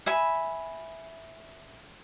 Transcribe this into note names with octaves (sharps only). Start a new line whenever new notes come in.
E5 G#5 B5